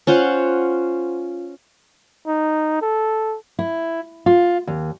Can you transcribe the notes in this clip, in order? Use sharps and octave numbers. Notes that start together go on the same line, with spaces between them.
C#4 F4 C5 F#5
D#4
A4
E4
F4
D#2